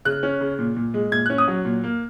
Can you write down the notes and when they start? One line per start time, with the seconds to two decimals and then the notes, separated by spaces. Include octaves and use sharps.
0.05 C#3 F#6
0.23 C#4
0.41 C#3
0.59 A#2
0.77 A#2
0.94 G#3
1.12 A#2 G#6
1.26 F#6
1.30 C#4
1.38 D#6
1.48 F#3
1.65 A#2
1.84 A#3